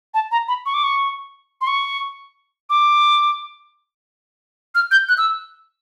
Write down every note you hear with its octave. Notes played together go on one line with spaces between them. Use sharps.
A5
A#5
B5
C#6
D6
C#6
C6
C#6
D6
F6
G6
F#6
E6